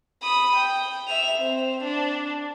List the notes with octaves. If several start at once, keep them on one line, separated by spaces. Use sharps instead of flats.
B5 D#6
G5
E5 F7
C4
D4